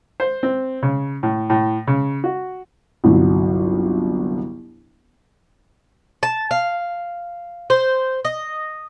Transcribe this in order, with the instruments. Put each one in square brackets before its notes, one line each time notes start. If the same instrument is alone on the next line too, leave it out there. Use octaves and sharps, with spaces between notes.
[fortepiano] C5
C4
C#3
A2
A2
C#3
F#4
[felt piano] G1 C2 F#3
[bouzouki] A5
F5
C5
D#5